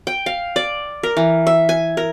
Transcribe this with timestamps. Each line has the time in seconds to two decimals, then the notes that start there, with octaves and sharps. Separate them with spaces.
0.07 G5
0.26 F5
0.56 D5
1.03 A#4
1.17 E3
1.47 E5
1.69 G#5
1.97 A#4